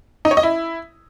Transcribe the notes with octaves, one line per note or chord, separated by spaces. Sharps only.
D#4
C#5
D#5
E4